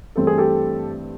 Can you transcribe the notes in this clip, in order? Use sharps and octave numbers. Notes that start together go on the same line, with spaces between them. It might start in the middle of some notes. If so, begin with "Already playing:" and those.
G2 E3 A3 C4 A4
G#4
G4 A4